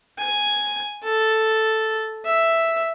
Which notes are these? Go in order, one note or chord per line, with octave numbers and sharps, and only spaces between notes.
G#5
A4
E5